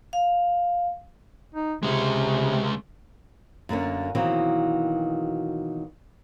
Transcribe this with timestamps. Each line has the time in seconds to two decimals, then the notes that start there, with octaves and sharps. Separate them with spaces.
0.13 F5
1.55 D#4
1.83 C#2 C3 G#3
3.69 F#2 D3 A#3 C#4
4.15 B2 D#3 E3 F#3 A#3 C4